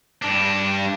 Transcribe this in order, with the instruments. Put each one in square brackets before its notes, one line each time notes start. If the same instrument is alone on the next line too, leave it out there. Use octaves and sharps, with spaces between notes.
[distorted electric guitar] G2 D4